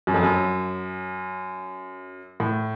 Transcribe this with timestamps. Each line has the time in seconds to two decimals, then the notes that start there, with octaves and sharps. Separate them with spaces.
0.07 F#2
0.14 F2
0.23 F#2
2.40 A2